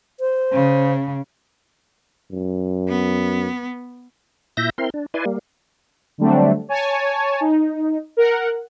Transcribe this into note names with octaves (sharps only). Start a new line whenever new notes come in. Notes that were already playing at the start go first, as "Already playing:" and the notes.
C5
C#3
F#2
B3
A#2 E4 E5 G6 A#6
C4 E4 A#4 C6
D4
E4 B4 D5 G#5 C6
G3 A#3
D3 F#3 G3 A3 C4 D4
C#5 G#5 A5
D#4
A#4 F#5